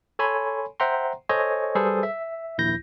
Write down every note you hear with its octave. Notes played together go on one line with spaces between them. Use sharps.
A4 C#5 G#5 B5 C6
C5 E5 F#5 G5 A#5 C6
A4 C5 C#5 D#5 G#5
G3 G#4 A4 B4 C5
E5
A#1 D#2 E4 G6 A#6